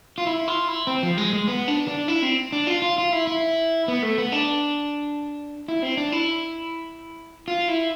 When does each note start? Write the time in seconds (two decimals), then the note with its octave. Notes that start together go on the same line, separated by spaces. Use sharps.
0.18 F4
0.27 E4
0.48 F4
0.68 E4
0.87 C4
1.03 F3
1.18 G#3
1.33 G#3
1.48 B3
1.68 D4
1.88 D4
2.08 E4
2.22 C4
2.52 D4
2.67 F4
2.82 F4
2.98 F4
3.12 E4
3.27 E4
3.88 B3
4.03 A3
4.18 B3
4.32 D4
5.68 E4
5.83 C4
5.97 D4
6.12 E4
7.48 F4
7.68 E4